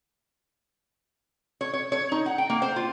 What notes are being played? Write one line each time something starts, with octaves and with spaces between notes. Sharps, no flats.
C#5
C#5
C#5
D#4
F#5
G5
A#3
C5
F4